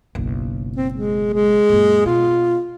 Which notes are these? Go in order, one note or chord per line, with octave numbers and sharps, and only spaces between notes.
F#1 B1
C4
G#3
G#3
F#2 A#2
B2 F4